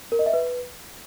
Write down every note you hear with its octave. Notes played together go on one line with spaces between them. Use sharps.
A#4
D#5
E5
B4